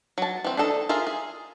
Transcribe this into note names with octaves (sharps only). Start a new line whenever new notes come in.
F#3 A5
E3 C4
D4 D#4 A4 D#5
F4 G#4 A#4 E5
G#4